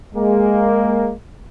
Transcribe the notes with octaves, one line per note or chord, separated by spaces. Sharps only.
G#3 A#3